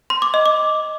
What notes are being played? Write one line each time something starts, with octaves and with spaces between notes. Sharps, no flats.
C6
D6
D#5
D6